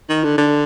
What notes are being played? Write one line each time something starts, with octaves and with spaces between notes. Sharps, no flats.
D#3
D3
D3